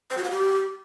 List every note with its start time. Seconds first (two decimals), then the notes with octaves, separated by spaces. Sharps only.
0.10 C5
0.17 F#4
0.24 F#5
0.31 G4